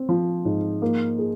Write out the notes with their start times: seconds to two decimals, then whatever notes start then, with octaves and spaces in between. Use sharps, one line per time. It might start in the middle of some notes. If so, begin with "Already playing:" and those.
Already playing: C4
0.09 F3
0.45 G#2
0.82 A#3
1.19 G#4